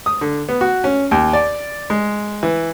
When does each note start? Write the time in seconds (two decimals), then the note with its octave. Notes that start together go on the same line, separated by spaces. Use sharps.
0.06 D#6
0.21 D3
0.49 B3
0.61 F#4
0.84 C#4
1.11 D#2
1.33 D5
1.90 G#3
2.43 E3